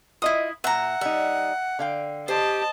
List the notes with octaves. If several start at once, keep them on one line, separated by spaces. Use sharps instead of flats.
E4 F4 D#5 E5 D#6
A#2 E5 F#5 A#5
G3 D#4 E5
D3 F5 G5
G4 C5 D#5 A5